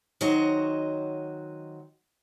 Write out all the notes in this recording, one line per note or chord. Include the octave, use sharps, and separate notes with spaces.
D#3 F#3 F#4 C5 C#5 D#5